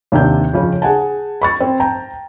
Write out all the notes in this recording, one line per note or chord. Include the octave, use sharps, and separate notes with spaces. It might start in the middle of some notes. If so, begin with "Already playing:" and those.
D#2 C3 D4 G6
F2 C#3 C#5
G#4 F#5 G#5 A5
B5 C#6 A6
C4
G5 A5 A#5